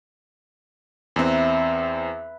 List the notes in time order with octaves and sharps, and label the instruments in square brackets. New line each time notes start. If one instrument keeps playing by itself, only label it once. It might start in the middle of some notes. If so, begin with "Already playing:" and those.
[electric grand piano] E2 C4 [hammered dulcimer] B4 E5 A#5